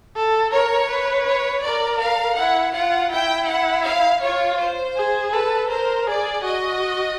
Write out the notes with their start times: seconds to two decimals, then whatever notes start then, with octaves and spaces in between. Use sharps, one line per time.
0.16 A4
0.53 A#4 C#5
0.90 B4
1.27 C#5
1.64 A#4 D5
2.01 F5
2.37 E4 F#5
2.74 F4 F#5
3.12 E4 G5
3.49 F#5
3.86 F5
4.23 F4 C#5
4.60 C5
4.97 G#4
5.33 A4 B4
5.71 A#4 C5
6.07 G#4 D5
6.45 F#4 D#5